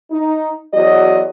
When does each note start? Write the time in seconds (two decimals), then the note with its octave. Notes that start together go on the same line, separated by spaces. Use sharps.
0.11 D#4
0.73 E2 F#3 F#4 D5 D#5